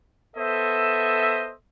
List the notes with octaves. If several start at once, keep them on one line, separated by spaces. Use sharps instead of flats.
B3 A4 C5 D#5 E5